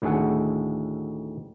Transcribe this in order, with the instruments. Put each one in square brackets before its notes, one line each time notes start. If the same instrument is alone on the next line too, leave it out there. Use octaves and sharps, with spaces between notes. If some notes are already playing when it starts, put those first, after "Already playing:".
[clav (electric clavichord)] D2 A2 D#3 G#4 A4 F#5